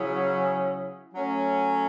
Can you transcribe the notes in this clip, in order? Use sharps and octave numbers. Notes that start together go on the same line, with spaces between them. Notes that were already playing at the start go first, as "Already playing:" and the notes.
Already playing: C#3 F#3 C#4 E4 G#4
F#3 A3 C#4